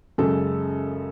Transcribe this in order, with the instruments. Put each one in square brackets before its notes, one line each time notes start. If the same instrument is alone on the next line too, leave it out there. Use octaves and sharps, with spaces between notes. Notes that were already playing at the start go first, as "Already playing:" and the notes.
[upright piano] F#2 C#3 G#3 A4